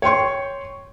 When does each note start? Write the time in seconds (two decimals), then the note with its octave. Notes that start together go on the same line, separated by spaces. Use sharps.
0.02 C#5 G5 C6 C#6